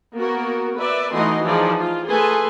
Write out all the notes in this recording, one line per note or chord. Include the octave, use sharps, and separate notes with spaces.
A#3 B3 F#4 A#4
B4 D5 E5
E3 A3 D#4 F#4 D#5 C6
E3 F3 D#4 G#4 D5
F4
A3 G#4 A4 B4 G#5 C6